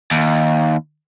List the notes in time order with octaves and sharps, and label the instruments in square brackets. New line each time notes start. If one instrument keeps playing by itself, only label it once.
[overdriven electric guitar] D#2